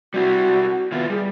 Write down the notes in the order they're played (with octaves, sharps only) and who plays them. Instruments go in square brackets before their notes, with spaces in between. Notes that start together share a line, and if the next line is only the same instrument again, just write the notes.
[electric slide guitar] G3 C4 E4 [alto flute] F#4
[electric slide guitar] D#3 E4 F4 [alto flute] B3
[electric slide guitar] G3 [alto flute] G#4